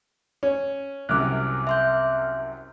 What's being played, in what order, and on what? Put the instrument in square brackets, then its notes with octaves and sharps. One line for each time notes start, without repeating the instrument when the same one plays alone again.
[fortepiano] C#4
[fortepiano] C2 F#2 C3 [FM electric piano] D6 F6 F#6
[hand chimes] E5 C6 G6